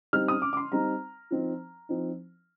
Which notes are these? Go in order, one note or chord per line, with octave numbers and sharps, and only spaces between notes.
G3 C4 D#4 F6
D#6
D6
D6
C6
G3 C4 D#4 A#5
F3 C4 D#4
F3 C4 D#4